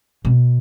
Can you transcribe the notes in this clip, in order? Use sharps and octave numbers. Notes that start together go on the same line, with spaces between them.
B2